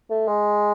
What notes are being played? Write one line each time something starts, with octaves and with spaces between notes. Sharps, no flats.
A3
G#3